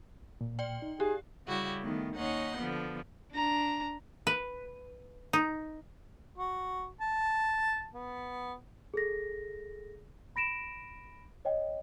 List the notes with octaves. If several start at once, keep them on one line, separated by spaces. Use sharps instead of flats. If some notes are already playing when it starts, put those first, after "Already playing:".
A#2
D5 G5
D#4
G4 G#4
C#3 G3 E4 F#4 G4
D#3 A3 B3
D#2 C#4 D#4 F#5 C6
D3 F3 B3
D4 A#5
B4
D#4
F#4
A5
B3
G#4 A4 A#6
B5 A#6 D7 E7
C#5 D#5 G5